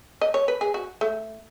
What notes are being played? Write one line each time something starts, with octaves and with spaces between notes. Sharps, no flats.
D#5
C#5
B4
G#4
F#4
A3